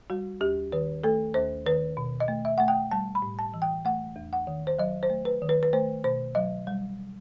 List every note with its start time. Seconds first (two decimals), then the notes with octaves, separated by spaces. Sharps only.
0.10 G3 F#4
0.41 D#2 G4
0.72 D#3 B4
1.04 A3 A4
1.34 D#2 C5
1.66 D#3 B4
1.97 B2
2.20 D#5
2.28 A3
2.45 E5
2.58 A3 F#5
2.68 G5
2.91 G3 A5
3.15 B5
3.22 A2
3.39 A5
3.54 E3
3.62 G5
3.85 A3 F#5
4.16 E2
4.33 F#5
4.47 D#3
4.67 C5
4.79 F#3 D#5
5.03 C5
5.10 A3
5.25 B4
5.42 D#3
5.49 B4
5.63 B4
5.73 A3 C5
6.04 B2 C5
6.35 F#3 D#5
6.67 G3